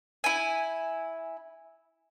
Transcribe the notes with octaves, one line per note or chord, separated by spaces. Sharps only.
E4 G#5